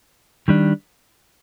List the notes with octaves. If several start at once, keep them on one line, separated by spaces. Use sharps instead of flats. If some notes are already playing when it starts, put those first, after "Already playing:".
D#3 G3 D4